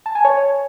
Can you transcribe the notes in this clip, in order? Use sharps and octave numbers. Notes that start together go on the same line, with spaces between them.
A5
G#5
C#5